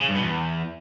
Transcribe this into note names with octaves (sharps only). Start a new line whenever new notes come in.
C#3
G2
B2
E2